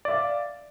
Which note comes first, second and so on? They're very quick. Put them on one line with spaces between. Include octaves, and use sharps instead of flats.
D5 E5 F5